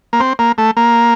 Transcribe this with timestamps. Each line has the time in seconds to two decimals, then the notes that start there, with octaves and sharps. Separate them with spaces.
0.13 A#3
0.20 C4
0.39 A#3
0.58 A3
0.77 A#3